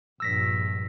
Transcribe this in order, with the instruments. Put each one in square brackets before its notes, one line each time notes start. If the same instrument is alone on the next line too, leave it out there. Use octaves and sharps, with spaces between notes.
[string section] A#1 G2 [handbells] E6 A#6 B6